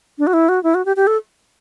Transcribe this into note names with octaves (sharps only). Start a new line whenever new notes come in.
D4
F#4
E4
F#4
E4
F#4
G4
G4
A4